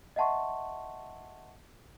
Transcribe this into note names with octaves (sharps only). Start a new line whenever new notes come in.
D#5 E5 F#5 A5 C6 C#6